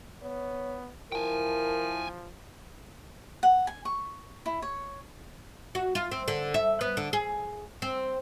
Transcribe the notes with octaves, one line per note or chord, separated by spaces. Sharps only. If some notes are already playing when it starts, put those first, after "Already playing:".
B3 C#5
F3 E4 A#4 G5 G#5
F#5
G#5
C#6
E4
C#5
F#4
F4
C4
D3
E5
B3
D3
G#4
C4